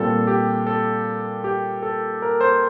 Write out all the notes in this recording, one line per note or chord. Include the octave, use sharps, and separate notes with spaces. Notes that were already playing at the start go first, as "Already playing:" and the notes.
Already playing: A#2 G3 C4 A4
G4
A4
G4
A4
A#4
C5